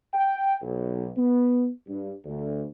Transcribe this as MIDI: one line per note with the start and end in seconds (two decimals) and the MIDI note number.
0.14 0.55 79
0.60 1.09 35
1.17 1.68 59
1.88 2.12 43
2.25 2.62 38